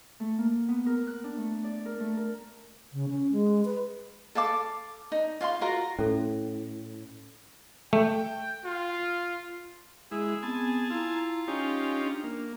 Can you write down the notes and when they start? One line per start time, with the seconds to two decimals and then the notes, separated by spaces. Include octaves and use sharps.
0.20 A3
0.38 A#3
0.68 B3
0.86 A#4
1.07 F#6
1.24 D4
1.37 A3
1.64 D5
1.85 A#4
2.00 A3
2.17 A#4
2.93 C#3
3.09 C#4
3.32 G#3
3.65 B4
4.35 A4 F5 A5 D6
5.12 D#4
5.41 F4 F5 A5 C6
5.61 F4 F#4 A#4 A#5
5.99 A2 C#4 A4
7.93 A3 G5
8.65 F4
10.11 G#3 E4 G#4
10.43 B3 C4 G#5 A5
10.90 E4 F4 A#5
11.48 C#4 D#4 G4 G#5
11.96 D4
12.24 A#3